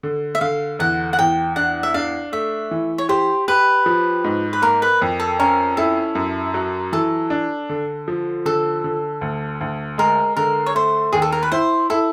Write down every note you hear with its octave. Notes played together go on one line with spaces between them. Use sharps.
D3
E5
D3 F5
E2 F#5
F#5
E2 G5
D4 F#5
E5
D4 F5
A3 E5
E3
C#5
G4 C5
G4 B4
F3
G#2
B4
A#3 A#4
B4
F2
A4
C#4 A#4
E4 A4
F#2
F#3
E3 A4
D4
D3
F3
D3 A4
D3
D2
D2
G#3 A#4
D3 A#4
C#5
A3 C5
D#2 G#4
A4
A#4
B4
E4 C5
E4 A4